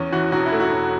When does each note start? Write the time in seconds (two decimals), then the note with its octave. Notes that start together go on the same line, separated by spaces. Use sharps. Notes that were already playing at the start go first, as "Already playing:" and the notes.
Already playing: E2 C#4
0.12 E3 F#4
0.32 E1 F#4
0.46 E4
0.52 A3
0.60 F#4
0.71 E1